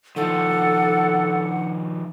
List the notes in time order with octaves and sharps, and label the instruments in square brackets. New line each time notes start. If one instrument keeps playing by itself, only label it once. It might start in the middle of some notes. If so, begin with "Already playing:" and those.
[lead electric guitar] D#3 F3 [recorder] A4 [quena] F#5